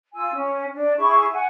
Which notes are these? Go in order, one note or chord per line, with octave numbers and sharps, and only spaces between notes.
F4 G#5 E6
C#4
D4
E4 G#4 C#6
F#5 G#5